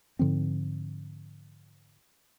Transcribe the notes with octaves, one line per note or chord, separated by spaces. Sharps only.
G#2 D3 F3 C4